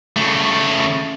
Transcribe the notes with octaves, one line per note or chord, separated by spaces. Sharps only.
C#3 A3